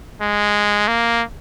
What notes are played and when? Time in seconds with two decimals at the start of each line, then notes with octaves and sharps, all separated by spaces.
0.21 G#3
0.88 A#3